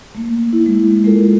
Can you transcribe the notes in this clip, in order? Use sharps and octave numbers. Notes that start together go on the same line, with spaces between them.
A3 A#3
E4
G#3
G#3 A3 E4 F4 A4 A#4